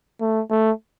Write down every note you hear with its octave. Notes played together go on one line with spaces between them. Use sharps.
A3
A3